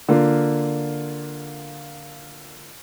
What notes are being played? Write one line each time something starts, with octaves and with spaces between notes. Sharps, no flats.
D3 A#3 F4